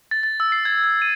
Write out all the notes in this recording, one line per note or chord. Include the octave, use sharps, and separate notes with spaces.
A6
A6
E6
C7
G#6
G#6
D#7